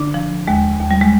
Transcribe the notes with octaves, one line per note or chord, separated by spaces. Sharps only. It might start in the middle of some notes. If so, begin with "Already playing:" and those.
Already playing: D3 D4
F3
D#2 G#3
D#2
G3
G#3